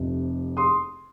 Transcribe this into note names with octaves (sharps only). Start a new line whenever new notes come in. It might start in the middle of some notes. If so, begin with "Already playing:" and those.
Already playing: F1 F2 C3
C6 D#6